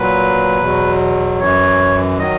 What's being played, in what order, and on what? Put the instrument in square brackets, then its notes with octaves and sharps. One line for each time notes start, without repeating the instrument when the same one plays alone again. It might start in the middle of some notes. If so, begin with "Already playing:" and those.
Already playing: [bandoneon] A#2 F#3 B4
E2 B2 F#3
F#2 E3 C#5
D#3 F#3 D#5